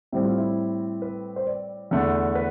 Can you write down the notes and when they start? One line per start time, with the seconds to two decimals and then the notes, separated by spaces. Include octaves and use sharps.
0.12 A2 G3 C4 E4
0.25 F4
0.38 E4
1.02 B4
1.36 C5
1.47 D5
1.91 E2 D3 A3
2.35 B4